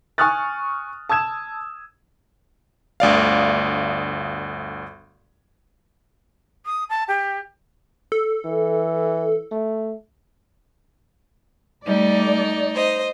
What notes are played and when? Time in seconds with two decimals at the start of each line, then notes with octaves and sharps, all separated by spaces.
0.18 G#5 C#6 D#6 F6 F#6 A6
1.09 A5 D#6 E6 G#6 E7
3.00 G1 D2 D5 F5
6.66 D#6
6.89 A5
7.08 G4
8.12 A4
8.45 E3
9.51 A3
11.87 G3 A3 D#4 D5
12.73 C5 D#5